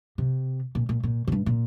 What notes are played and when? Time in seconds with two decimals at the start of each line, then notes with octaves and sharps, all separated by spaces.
0.18 C3
0.75 A#2
0.89 A#2
1.03 A#2
1.27 A#2
1.32 G2
1.46 A#2